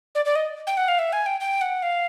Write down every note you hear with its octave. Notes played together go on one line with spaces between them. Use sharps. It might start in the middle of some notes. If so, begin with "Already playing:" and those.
D5
D5
D#5
G5
F#5
F5
E5
G#5
G5
G5
F#5
F5